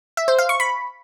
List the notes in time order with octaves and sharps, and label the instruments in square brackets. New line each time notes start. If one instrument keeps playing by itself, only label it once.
[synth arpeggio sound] E5
C5
F5
C#6
B5